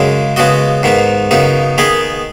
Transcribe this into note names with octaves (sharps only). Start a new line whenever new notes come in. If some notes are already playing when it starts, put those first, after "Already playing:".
Already playing: F#2 C#3 G#3
C#3 G#3 B3 F#4 D#5
G#2 D#3 B3
F#2 C#3 B3 D#4
D#3 B3 G#4 B4 D#5